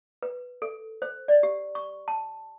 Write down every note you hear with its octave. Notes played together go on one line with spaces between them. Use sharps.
B4
A4
C5
D5
G4
C#6
A5